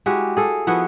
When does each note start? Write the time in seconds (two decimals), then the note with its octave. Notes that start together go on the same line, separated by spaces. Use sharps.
0.06 G#3 E4 F#4 G4
0.37 G#4 A4
0.67 F3 B3 E4 F#4